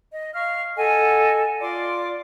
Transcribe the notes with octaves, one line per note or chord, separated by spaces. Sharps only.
D#5
F5 C#6 F6
A4 D#5 F#5 G#5
F4 D5 C6 D6